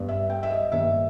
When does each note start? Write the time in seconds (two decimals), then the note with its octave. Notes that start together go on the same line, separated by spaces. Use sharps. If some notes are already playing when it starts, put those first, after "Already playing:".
Already playing: G2 G3 B3
0.09 E5
0.30 G5
0.43 E5
0.50 D#5
0.72 G2 D#3 A#3 E5